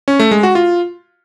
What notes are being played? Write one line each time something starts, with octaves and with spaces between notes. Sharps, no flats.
C#4
A3
G#3
F#4
F4